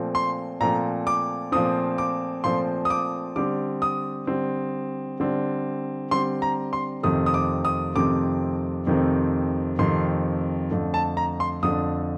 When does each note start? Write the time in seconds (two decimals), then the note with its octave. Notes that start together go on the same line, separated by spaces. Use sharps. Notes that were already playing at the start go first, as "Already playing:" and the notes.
Already playing: A#2 F3 A3 C4
0.15 C6
0.61 A#2 F3 A3 C4 A#5
1.07 D6
1.52 A#2 F3 A3 C4 D#6
1.98 D6
2.44 A#2 F3 A3 C4 C6
2.85 D#6
2.90 D6
3.36 D3 G3 C4 D6
3.82 D#6
4.27 D3 G3 C4
5.20 D3 G3 C4
6.11 D3 G3 C4 C6
6.42 A#5
6.73 C6
7.03 F2 C3 D#3 A3 C4 D#6
7.26 D#6
7.34 D6
7.65 D#6
7.95 F2 C3 D#3 A3 C4 D6
8.87 F2 C3 D#3 A3 C4
9.79 F2 C3 D#3 A3 C4 C6
10.71 F2 D3 A3
10.94 A5
11.17 A#5
11.40 C6
11.63 F2 D3 A3 D#6